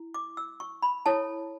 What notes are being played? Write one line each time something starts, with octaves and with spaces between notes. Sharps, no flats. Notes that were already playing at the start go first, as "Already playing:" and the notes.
Already playing: E4
D6
E6
C#6
B5
E4 A4 C#5 A5